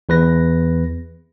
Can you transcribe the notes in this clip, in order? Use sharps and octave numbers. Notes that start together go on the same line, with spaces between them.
E2 B4 A#6